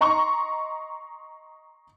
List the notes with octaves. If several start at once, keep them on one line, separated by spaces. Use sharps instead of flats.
D#5 A#5 C6 C#6